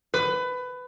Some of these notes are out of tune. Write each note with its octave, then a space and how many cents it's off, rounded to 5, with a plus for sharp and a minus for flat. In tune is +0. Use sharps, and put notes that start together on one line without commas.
B4 +20